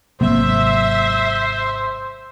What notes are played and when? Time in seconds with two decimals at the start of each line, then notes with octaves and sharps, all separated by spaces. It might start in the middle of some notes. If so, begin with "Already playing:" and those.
0.21 G#1 C3 F#3 A#3 C5 E5